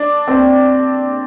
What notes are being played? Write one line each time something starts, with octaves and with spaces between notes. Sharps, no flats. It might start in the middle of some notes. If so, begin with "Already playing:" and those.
Already playing: D4
C4